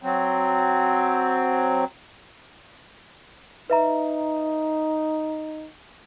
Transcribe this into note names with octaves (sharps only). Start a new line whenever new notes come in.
F#3 C4
D#4 B4 E5 A#5